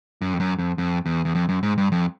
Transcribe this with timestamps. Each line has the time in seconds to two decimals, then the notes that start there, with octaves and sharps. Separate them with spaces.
0.21 F#2
0.33 F2
0.40 F#2
0.58 F2
0.78 F2
1.06 E2
1.25 E2
1.35 F2
1.49 F#2
1.63 G#2
1.78 G2
1.92 F2